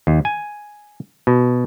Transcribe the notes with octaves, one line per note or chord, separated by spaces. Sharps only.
D#2
G#5
B2